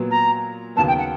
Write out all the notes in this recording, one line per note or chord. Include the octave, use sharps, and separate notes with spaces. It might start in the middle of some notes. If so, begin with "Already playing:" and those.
Already playing: A#2 F#3 B3
A#5
D#2 C#3 F#3 B3 A5
G5
F#5